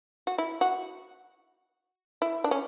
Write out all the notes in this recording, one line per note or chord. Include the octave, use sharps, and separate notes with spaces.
F#4
E4
F#4
E4
D4
C#4